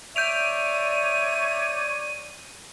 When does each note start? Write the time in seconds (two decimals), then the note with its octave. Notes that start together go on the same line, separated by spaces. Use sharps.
0.16 C#5 D5 E5 G6 D7 D#7 F7